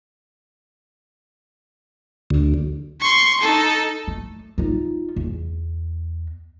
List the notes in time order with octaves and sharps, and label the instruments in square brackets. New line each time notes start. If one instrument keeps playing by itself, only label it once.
[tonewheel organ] D2
[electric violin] C6 C#6
D#4 A4
[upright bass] A3
D#4 F4
E2